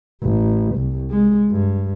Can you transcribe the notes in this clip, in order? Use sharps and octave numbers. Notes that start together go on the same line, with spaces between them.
A1
C2
G#3
G2